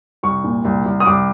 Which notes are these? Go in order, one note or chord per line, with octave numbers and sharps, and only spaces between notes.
C2 C#6
A#2
C2
C2
D#6
C2 D6